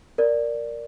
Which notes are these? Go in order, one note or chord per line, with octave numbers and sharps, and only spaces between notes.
A#4 D5